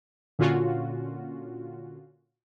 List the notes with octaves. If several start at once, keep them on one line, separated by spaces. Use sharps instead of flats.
A#2 D3 C#4 F4 F#4